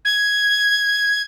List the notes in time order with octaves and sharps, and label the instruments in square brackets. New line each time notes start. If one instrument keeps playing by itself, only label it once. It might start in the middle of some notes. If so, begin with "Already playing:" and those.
[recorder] G#6